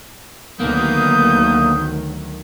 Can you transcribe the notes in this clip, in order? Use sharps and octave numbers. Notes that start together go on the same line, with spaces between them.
D2 D#3 F#3 A#3 B3 D#6 G6